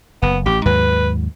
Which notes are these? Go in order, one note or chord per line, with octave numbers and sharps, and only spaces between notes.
F#1 B3
A1 G4
D#2 G#2 F#3 B4